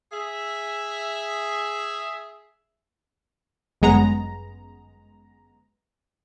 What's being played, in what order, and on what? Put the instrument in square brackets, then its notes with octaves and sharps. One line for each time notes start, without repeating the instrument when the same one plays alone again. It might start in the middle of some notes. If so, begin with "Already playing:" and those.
[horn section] G#4 E5
[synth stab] G1 F#2 G#3 B3 A#5